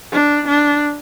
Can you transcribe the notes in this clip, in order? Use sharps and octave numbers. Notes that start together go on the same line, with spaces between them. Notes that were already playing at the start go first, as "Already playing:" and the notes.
D4
D4